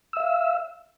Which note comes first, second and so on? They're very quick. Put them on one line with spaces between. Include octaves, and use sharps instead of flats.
E6 E5 F5